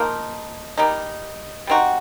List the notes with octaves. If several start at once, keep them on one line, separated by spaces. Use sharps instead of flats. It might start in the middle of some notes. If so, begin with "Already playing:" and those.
Already playing: F3 A#3 D#4
G3 A#3 D#4
G3 C4 D#4 F#4